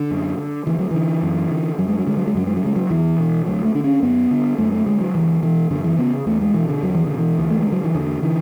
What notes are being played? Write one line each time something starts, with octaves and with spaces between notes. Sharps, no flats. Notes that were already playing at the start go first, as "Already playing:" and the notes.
Already playing: D3
F#2
D3
D2 E3
F#3
D3 E3
F#2
D3
F#2 F#3
G#3
F#3
D3 G#3
F#3
G#3
F#2 F#3
G#3
F#3
C#3 G#3
F#3
E2 E3
B2
D2 F#3
A3
D3 D4
C#4
F#2 B3
D3
F#2 A3
A3
D3 G#3
F#3
C#2 E3
B2 E3
F#2 D3
E3
C#3 B3
E2 A3
G#3
B2 E3
D3
E2 F#3
E3
B2 D3
E3
D2
A3
G#3
D3
F#3
E3
E2 D3
D3 E3